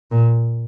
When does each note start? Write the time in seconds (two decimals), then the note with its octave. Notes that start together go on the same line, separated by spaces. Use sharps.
0.11 A#2